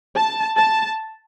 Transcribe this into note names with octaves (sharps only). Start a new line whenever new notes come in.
A5
A5